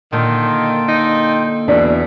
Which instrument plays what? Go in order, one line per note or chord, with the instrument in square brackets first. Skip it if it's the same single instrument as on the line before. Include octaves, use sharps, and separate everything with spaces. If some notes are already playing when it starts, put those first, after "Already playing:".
[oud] A#2 D3 [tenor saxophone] D#3 [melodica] F4 A4 G5
[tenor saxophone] D#4
[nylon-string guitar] E2 D4 [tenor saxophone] B2 [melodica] E5